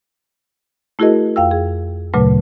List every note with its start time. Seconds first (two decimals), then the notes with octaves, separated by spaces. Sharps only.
0.99 A3 E4 F#4 G#4 A#4 D#5
1.36 F2 F5 G5 E6
1.51 G#4
2.14 D2 A#2 C#3 F#3 A3 B4